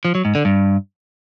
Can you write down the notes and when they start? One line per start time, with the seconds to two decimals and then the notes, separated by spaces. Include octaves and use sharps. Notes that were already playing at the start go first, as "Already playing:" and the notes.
0.05 F3
0.15 F#3
0.25 G#2
0.35 D3
0.45 G2